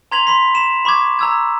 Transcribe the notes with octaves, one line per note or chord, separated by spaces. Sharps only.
A#5 C6 G#6 B6 F7 F#7
B5 C6 B6
B5 B6 E7
B5 C#6 D6 G#6
A#5 E6 G#6